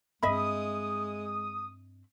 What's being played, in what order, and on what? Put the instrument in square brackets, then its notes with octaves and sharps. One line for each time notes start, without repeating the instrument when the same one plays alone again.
[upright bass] G2 C4 [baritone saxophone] G#3 [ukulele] D#5 E5 B5 [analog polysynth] D#6